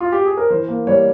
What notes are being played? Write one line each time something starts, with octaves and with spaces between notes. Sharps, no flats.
F4
G4
G#4
A#4
E3 C5
A#3
G3 C#5